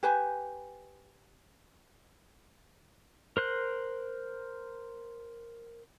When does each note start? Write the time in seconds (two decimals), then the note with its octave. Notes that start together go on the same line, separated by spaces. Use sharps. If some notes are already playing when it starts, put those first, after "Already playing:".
0.03 G4 B4 C5 G#5
3.37 A#4 C5 F#6